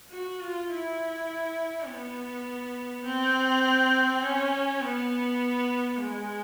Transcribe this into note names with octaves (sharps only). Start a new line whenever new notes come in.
F#4
F4
E4
B3
C4
C#4
B3
G#3